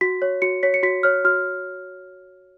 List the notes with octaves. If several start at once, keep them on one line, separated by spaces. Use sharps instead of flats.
F#4 B6
C#5
F#4 C#7
C#5 B6
C#7
F#4 B6
C#5 F6
F#4 F6